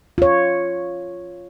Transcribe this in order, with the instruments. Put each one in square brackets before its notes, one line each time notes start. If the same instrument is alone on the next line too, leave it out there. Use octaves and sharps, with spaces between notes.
[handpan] F4 C#5